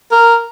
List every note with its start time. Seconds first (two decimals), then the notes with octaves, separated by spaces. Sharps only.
0.12 A#4